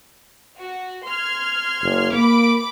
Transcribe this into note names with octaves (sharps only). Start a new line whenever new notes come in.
F#4
C6 F6 G#6
F#1
A#3 B5 D6 D7